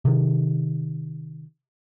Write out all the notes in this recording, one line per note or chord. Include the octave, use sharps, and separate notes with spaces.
C3 D#3